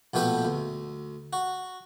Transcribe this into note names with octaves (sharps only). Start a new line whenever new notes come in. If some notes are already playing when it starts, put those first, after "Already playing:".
A#1 B2 A3 G4 B4
D2
F#4